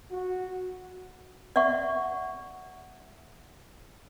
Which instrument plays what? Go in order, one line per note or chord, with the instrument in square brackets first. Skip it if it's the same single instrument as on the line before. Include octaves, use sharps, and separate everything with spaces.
[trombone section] F#4
[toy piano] D5 E5 F#5 C#6